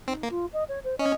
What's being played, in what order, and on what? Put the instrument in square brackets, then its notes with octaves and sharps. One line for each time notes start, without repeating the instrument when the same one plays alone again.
[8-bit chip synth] C4 [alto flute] D#4
[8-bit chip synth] A#3
[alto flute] F4
D#5
C#5
C5
[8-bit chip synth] C#4 [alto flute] D#5